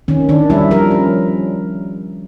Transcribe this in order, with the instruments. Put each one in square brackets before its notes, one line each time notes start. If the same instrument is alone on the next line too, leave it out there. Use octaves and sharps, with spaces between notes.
[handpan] D#3 C#4
D#3 D4
G3 E4
F3 A#4
C#4